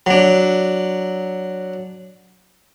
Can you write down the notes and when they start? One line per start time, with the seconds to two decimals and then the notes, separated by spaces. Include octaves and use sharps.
0.06 F#3 D4